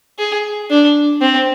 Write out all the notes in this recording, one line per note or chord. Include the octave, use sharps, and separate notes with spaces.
G#4
D4
C4